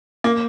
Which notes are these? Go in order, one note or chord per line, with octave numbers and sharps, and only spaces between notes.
A#3